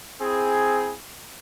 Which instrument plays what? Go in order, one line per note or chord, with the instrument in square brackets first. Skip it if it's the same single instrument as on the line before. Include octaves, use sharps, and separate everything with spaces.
[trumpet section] C4 E4 G#4